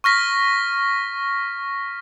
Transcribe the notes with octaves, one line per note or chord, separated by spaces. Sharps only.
C#6 F6 A#6 B6